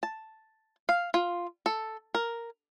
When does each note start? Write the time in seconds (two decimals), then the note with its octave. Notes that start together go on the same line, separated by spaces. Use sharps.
0.03 A5
0.89 F5
1.14 F4
1.66 A4
2.15 A#4